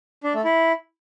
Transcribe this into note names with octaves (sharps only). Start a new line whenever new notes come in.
D4
A3
E4